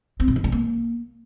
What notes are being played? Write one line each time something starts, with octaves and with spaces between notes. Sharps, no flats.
C4
B2
E3
C#4
A#3